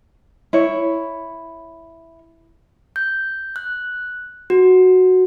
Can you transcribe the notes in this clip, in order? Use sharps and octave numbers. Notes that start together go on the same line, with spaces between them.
E4 C#5
G6
F#6
F#4